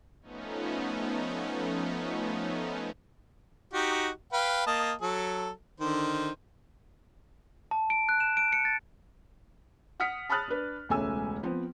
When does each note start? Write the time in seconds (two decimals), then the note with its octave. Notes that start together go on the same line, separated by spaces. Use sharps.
0.22 F3 A3 B3 C#4 D#4
3.73 D#4 F#4 G4
4.33 B4 F5 G5
4.67 A#3 D#5 A5
5.01 F#3 A4
5.80 D3 D#3 C5
7.71 A5
7.90 D7
8.09 F#6
8.20 E7
8.37 D7
8.53 C#7
8.65 A6
10.00 F#5 D#6 F6 B6 C#7
10.29 A5 B5 D#6 F6 F#6 A6
10.48 D4 B4
10.89 E1 C#2 A3 C#4 G#5 E6
11.43 F3 B3 C4